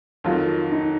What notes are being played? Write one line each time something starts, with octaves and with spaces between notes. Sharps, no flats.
F2 D#3 F#3 F4
D#4